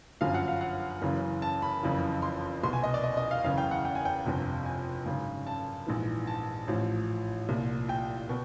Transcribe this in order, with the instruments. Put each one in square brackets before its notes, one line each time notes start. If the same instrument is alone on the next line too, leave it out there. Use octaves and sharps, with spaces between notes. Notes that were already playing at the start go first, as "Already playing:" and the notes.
[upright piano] G1 F#2 D3 F3 F5
F#5
F5
F#5
F#1 F#2 C#3 E3
A5
B5
F#1 F2 C#3 E3
C6
C2 B2 C6
G#5
D#5
D5
D#5
D#5
F5
F#1 E2 C#3 F5
G5
F#5
G5
G#5
G5
G1 F2 C3
G#5
G#1 F#2 C#3
A5
A#1 G#2 E3
A5
A1 A2 F3
C2 A#2 F3
G5
B2